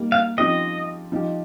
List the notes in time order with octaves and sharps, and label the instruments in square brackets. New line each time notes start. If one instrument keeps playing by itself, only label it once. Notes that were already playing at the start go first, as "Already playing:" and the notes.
Already playing: [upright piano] G3 A#3 D#4
[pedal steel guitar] F5
[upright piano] F3 C4 D#4 G4 [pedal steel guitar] D#5
[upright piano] F3 D#4 G4